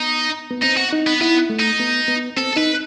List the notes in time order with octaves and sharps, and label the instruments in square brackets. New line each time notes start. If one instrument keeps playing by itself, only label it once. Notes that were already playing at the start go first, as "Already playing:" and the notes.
Already playing: [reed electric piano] B3 [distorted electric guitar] D#4
[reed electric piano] B3
[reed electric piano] C4 [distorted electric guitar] D#4
[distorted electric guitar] F#4
[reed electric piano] D#4
[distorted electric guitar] B3
[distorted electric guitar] B3 [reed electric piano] E4
[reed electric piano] A3
[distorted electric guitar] D#4
[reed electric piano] B3
B3
[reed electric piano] C4 [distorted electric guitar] A4
[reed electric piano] D#4 [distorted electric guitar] B4